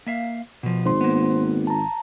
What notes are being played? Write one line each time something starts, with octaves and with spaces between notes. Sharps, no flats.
A#3 E5 F5
B2 F3
G#1 C5 C6
A#3 B3
A5 A#5